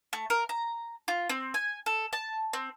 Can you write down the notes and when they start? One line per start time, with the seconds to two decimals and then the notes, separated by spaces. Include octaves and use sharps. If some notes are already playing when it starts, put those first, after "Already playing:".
0.13 A3
0.30 A#4
0.49 A#5
1.08 F4
1.29 C4
1.54 G#5
1.86 A4
2.13 A5
2.53 C4